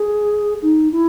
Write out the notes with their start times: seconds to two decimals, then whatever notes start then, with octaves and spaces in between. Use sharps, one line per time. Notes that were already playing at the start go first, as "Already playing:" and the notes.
Already playing: G#4
0.62 D#4
0.92 E4